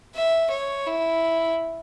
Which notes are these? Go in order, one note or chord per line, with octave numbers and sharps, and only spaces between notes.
E5
C#5
E4